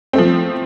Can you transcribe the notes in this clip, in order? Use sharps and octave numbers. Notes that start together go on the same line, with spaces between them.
F3 A3 C4